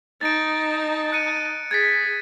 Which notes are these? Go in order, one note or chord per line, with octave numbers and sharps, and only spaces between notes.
D#4 A5 A6 D7
F#6 C#7 D#7
G#4 G#6 A6 B6